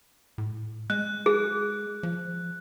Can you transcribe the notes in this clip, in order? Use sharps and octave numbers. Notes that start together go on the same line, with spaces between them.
A2
G#3 F#6
G#4
F3